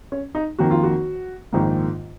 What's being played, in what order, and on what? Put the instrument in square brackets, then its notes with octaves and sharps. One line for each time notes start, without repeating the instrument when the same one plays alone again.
[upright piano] C#4
D#4
F2 D#3 A#3 F#4
F4
F#4
A#1 G#2 D#3 A#3